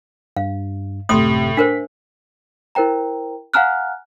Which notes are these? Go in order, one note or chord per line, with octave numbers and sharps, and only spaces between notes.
G2 F5
G#1 F#2 A2 C3 C6 D#6
D4 A#4 C5 B6
E4 A#4 C5 G5 A#5
F5 F#5 G#5 A#5 F6 F#6